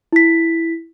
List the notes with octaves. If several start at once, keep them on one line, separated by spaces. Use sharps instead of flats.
E4 B6